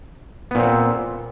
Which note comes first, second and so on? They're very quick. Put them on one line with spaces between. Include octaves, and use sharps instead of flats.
B3 A#2 C4